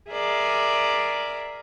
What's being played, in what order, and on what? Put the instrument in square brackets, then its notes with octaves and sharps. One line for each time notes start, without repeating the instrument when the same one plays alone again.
[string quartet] G#4 A#4 D5 E5